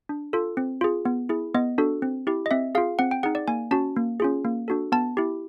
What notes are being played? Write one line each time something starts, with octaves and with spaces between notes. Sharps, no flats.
D4
F4 A4
C4
F4 G#4
B3
E4 G#4
B3 D#5
D4 F#4 A4
C4
E4 G4
D#5
C4 E5
F4 G#4 F5
C4 F#5
G5
D#4 G#4 F#5
D5
A#3 G#5
C#4 F#4 A5
A#3
C#4 F4 G#4
A#3
D4 F#4 A4
B3 A5
E4 G4